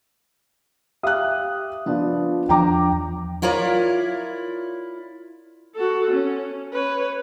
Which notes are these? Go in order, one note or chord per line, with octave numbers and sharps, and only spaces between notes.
G4 E5 F5 D#6 F#6
F3 B3 D4 F4
E2 F3 D4 G5 A#5 D6
E4 F4 A#4 C#5 D5
F#4 A4
C#4
B4 C#5